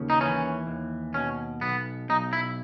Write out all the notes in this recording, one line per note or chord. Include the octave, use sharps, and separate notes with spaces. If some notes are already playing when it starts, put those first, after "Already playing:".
Already playing: D#2 C#3
D#4
E3 C#4
D#2
B2 C#4
B1 B3
B1 D#4
E4